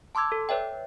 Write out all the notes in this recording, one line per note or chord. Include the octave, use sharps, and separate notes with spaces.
A5 C6 D6 E6 G#6
A4
B4 C#5 D5 E5 G5